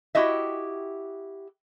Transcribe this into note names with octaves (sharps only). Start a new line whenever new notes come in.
E4 F#4 G4 D#5 E5